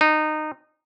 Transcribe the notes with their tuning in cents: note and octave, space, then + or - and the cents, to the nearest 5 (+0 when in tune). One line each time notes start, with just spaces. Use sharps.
D#4 -20